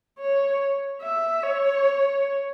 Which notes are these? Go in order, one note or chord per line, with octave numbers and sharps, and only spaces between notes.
C#5
E5
C#5